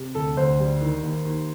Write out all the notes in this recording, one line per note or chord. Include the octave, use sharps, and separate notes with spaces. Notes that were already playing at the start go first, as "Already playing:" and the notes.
Already playing: C3
D2 A4
D2 C5
G3
D#3
D#2
D#2